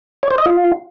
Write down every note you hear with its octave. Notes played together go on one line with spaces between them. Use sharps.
C#5
C5
D#5
F4